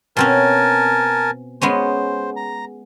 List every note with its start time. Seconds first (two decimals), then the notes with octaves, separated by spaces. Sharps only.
0.17 B2 C4 C#4 A#4 G#5 A5
1.61 G#3 B3 C#4 C5
2.36 A#5